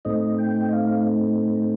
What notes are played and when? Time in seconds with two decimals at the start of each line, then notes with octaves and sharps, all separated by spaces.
0.05 A2 A3 C4 D#4 D#5
0.38 G5
0.69 D#5
0.73 F5